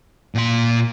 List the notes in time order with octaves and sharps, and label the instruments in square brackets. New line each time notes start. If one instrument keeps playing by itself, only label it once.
[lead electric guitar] A#2 C6